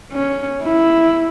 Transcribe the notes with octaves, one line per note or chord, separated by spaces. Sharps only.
C#4
E4